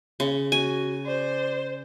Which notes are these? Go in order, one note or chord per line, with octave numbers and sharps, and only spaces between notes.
C#3
F#4 G#5
C5 D5